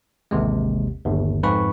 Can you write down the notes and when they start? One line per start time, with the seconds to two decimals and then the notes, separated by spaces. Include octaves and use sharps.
0.31 A1 D#2 C3 G#3
1.05 G1 D#2
1.43 F2 G#2 B4 B5 C#6